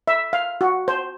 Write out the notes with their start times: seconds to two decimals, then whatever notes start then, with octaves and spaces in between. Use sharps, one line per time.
0.08 E5
0.33 F5
0.61 F#4
0.88 C5